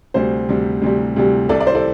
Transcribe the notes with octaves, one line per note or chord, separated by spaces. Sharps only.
D2 C3 G3 C5
D2 C3 G3
D2 C3 G3
D2 C3 G3
C2 C3 G3 A4 D5
D5
C5
A4 D5